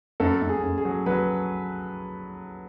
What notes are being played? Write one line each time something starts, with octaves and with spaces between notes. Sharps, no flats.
F#2 A4
F#2
G#4
F#2
G#4
F#3
F#3 B4